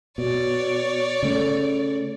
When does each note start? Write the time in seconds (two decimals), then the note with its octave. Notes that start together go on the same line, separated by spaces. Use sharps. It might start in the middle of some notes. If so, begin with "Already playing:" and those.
0.18 B2 C#5 D5
1.23 C#3 A3